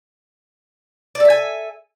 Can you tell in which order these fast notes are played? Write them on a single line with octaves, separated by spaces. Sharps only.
D5 A4 E5 G#5